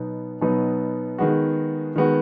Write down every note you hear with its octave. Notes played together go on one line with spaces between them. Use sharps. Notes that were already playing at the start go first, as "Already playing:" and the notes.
Already playing: B2 F#3 B3 D#4
B2 F#3 B3 D#4
D#3 G#3 B3 F#4
D#3 G#3 B3 F#4